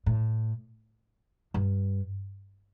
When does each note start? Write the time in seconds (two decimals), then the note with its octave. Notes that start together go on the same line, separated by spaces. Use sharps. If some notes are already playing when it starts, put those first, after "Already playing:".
0.06 A2
1.54 G2